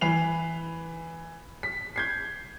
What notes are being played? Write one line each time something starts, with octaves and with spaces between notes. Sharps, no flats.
E3 B4 C7 F7
B6
G6 G#6 C7